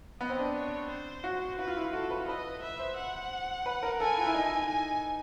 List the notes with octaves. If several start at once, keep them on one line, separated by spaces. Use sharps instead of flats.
B3 D#5
C4
D4
C#5
C5
F#4
F#4 B4
F4
E4
F4
F#4 A4
B4
B4 D#5
B4 E5
C5
F#5
B4
A#4
A4 G#5
F4
E4
D#4
G#5